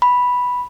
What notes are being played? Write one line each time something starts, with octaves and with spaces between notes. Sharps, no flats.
B5